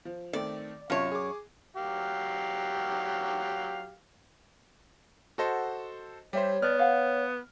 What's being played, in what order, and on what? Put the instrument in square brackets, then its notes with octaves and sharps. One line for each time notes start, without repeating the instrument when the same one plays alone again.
[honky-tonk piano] F3
[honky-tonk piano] D#3 A3 C4 [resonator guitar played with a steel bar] D5
[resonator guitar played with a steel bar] F#2 C#5 [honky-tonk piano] C3 F4 A5
[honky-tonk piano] G#4 D6
[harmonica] F#3 G4 F5
[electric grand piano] F#4 A4 C5 [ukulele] D#5 F#5
[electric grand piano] G3 C5 [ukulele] G4 E5 [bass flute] C#5
[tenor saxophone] B3 [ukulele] D5 A5 [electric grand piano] F6
[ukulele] F5 F#5